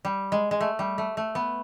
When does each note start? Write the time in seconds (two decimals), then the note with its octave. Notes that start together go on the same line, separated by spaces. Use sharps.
0.05 G3
0.32 G#3
0.51 G#3
0.61 A3
0.79 G3
0.98 A3
1.17 A3
1.35 B3